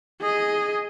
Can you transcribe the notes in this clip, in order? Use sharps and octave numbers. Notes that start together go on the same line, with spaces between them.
G#4 D#5